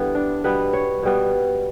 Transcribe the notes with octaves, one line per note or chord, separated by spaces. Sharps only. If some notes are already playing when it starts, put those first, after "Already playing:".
Already playing: D3 G3 B3 E4
D4
B2 G3 B3 B4
C#5
B2 G3 B3